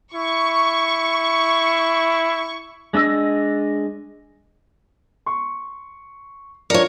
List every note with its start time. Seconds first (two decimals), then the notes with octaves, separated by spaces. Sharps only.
0.14 E4 C#6
2.93 G#3 D4 D#5 E6
5.26 C6 C#6
6.70 D4 F4 A#4 C#5 C#7